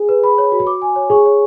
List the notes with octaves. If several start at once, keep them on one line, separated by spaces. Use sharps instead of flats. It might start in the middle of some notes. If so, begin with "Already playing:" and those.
Already playing: G#4
B4
B5
C#5
F#4
D6
G#5
C#5
G#4 C#6
C#5